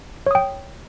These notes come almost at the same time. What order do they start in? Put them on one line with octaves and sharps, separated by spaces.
C#5 D#6 G5